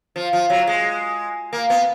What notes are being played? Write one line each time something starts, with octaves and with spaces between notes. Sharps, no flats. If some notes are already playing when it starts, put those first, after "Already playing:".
F3
F3
F#3
G#3
A#3
B3